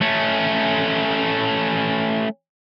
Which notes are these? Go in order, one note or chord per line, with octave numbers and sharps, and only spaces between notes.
A3 C#4